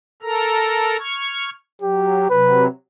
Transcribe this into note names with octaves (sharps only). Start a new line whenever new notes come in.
A4 A#4 A#5
C#6 F6 G#6
F#3 G4
C3 F#3 B4